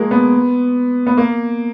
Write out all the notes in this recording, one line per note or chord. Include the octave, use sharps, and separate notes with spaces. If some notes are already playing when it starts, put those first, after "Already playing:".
Already playing: F3 G#3 A#3
B3
B3
A#3